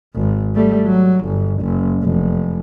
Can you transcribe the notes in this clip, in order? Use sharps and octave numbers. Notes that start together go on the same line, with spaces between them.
G#1
G3 A3
F#3
G1
F#1
F1